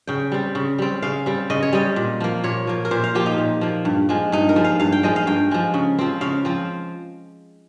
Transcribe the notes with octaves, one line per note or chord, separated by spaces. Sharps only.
C#3 G5
G3 C4
C#3
G3 C4
C#3 F5
G3 C4
C#3 D#5
C#5
G3 C4 D#5
A#2
F3 A#3
A#2 C#5
F3 A#3
A#4
A#2 C5
F5
F3 A#3 G4
D#4
A#2
F3 A#3
G2
F3 G#3
G2 D#4
A#4
F3 G#3
F5
G2 F5
G5
F3 G#3 D#5
F5
G2 G5
F3 G#3
C#3
F3 C4
C#3 F5
F3 C4